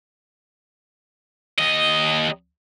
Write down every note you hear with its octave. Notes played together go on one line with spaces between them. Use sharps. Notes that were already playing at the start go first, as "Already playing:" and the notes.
D#2 D#5